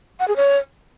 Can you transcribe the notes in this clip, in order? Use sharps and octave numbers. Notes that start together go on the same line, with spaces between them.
F#5
G#4
C#5